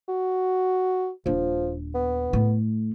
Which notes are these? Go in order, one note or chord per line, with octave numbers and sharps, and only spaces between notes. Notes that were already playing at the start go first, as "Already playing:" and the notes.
F#4
D#1 F3 D4
B3
A2 A3